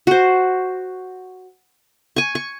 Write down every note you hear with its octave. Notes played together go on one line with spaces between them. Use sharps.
F#4 C5
G#5 C#6
C#6